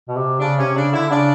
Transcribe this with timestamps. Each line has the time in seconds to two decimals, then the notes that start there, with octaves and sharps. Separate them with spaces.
0.08 B2
0.16 C3
0.39 C#3 D4
0.58 C3 C#4
0.75 C#3 D4
0.93 D3 E4
1.11 C#3 D4